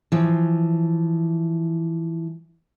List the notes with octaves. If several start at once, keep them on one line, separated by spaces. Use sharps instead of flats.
E3 F3